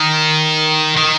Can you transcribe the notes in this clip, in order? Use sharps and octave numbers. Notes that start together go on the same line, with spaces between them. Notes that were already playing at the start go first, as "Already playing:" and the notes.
Already playing: D#3
D#3